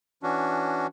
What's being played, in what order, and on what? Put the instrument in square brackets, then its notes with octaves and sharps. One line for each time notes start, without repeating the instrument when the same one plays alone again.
[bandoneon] E3 C#4 D4 F#4